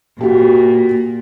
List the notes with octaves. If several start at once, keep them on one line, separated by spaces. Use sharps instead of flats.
A#2 F#4 G4